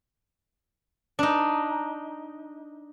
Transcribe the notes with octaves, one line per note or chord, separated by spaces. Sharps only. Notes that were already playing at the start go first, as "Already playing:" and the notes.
D4 D#4